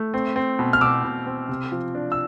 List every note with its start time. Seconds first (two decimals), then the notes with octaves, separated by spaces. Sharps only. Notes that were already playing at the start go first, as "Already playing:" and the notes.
Already playing: A3
0.14 C4
0.36 C4
0.59 B2
0.73 F6
0.81 B2 D6 E6
1.04 B2
1.26 C4
1.49 C3
1.72 F3
1.95 D4
2.12 E6